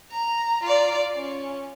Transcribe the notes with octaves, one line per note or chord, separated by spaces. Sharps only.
A#5
F4 D5
C#4